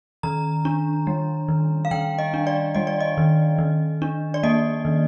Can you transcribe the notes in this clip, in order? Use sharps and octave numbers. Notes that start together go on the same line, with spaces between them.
D#3 A#5
D4
G3
D#3
F5
D#3 G5
D#5
D4
D5
G3 D#5
D5
D#5
D#3
D#3
D4
D5
A#3 D#5
D#3